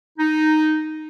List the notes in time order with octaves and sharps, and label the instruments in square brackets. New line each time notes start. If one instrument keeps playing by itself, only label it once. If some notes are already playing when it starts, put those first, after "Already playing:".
[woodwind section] D#4